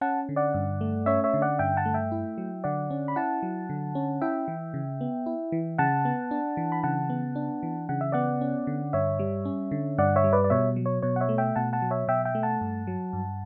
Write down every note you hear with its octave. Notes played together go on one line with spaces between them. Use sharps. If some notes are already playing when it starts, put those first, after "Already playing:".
C#4 F#5 A5
D3
D5 F#5
G2
A3
C#4 C#5 E5
C#5 E5
D3
D5 F#5
G2 E5 G5
F#5 A5
A3
E5 G5
E4
F#3
D3 D5 F#5
C#4
B5
E4 F#5 A5
F#3
D3
C#4
E4 E5 G5
E3
C#3
B3
E4
E3
C#3 F#5 A5
B3
D4
E3
B5
C#3 F#5 A5
B3
D4
E3
C#3 F#5
E5
B3 D5 F#5
C#4
D3
G2 C#5 E5
G3
C#4
D3
G2 D5 F#5
C#5 E5
G3
B4 D5
D5
B2 C#5 E5
F#3
C#5
B2 C#5
F#5
C#5 E5
A3
E5 G5
B2 F#5 A5
F#5 A5
F#3
C#5 E5
B2 E5 G5
E5 G5
A3
F#5 A5
G2
F#3
G2